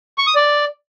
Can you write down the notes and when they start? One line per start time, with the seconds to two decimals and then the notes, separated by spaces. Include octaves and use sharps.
0.18 C#6
0.27 D#6
0.36 D5